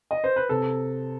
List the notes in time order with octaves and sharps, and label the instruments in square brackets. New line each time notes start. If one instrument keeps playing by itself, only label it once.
[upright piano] D#5
C5
B4
C3 A4